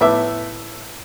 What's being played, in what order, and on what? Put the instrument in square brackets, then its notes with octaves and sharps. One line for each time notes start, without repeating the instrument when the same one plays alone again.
[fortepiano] A2 B3 E5 D6